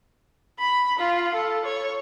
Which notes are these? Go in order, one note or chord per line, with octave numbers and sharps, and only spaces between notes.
B5
F4
A4
C#5